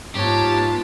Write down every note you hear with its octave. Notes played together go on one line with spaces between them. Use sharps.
G#2 B3 D#4 F4 G4 C#5 A5